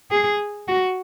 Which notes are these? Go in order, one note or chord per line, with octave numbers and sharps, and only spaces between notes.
G#4
F#4